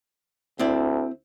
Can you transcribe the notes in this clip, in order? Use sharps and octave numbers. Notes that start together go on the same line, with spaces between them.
D2 C4 E4 D5